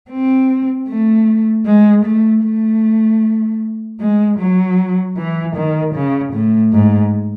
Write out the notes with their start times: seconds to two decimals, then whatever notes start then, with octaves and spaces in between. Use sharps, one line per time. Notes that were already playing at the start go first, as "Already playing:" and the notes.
0.10 C4
0.88 A3
1.66 G#3
2.05 A3
2.44 A3
4.00 G#3
4.39 F#3
5.17 E3
5.56 D#3
5.94 C#3
6.33 A2
6.72 G#2